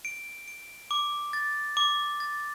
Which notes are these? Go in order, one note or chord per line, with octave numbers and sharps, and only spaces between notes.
D7
D7
D6
A6
D6
A6